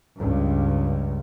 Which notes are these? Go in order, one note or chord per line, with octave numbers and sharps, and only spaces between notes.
C#2 G2